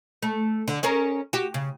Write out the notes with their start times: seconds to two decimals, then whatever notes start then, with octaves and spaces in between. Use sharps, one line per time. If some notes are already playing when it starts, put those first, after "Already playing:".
0.22 A3
0.68 D3
0.83 C#4 G#4 A#4
1.33 F#4 G4
1.54 C#3